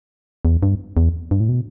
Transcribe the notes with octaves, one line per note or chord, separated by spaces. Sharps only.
E2
G2
E2
G2
A2
B2